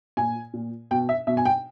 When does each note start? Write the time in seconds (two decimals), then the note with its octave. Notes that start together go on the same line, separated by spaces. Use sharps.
0.17 A#2 G#5
0.53 A#2
0.91 B2 G5
1.09 E5
1.27 B2 E5
1.37 G#5
1.45 G5